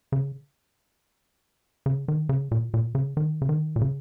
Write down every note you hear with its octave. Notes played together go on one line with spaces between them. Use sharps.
C#3
C#3
D#3
C#3
A#2
A#2
C#3
D#3
C#3
D#3
A#2
C#3